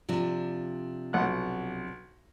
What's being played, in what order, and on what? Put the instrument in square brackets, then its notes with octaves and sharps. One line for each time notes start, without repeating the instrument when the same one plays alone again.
[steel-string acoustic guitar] C3 F3 D4
[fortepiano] B1 F#5 F#6